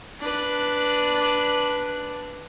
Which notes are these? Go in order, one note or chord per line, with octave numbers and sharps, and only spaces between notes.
D4 B4